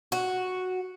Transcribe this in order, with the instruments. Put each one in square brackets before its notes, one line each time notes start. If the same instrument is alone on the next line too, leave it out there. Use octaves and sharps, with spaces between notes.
[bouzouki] F#4